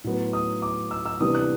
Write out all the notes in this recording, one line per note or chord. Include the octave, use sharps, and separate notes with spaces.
A2 F#3 B3
D#6
D6
E6
E6
C3 E3 G3 B3 D4 D#6
F#6